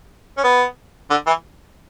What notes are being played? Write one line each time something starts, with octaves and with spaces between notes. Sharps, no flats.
C#4
B3
D3
E3